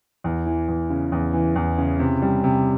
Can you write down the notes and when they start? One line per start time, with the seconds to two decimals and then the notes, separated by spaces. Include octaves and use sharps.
0.24 E2
0.46 E3
0.68 E2
0.90 C#3
1.12 E2
1.34 E3
1.56 E2
1.78 C#3
2.00 C3
2.22 G3
2.44 C3